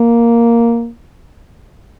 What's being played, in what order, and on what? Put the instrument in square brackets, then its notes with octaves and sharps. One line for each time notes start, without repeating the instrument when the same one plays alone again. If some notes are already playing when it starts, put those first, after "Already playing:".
Already playing: [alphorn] A#3